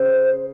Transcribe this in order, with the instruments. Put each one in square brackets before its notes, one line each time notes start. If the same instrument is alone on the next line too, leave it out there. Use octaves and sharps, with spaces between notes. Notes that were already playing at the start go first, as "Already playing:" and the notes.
Already playing: [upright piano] C#3 [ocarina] C5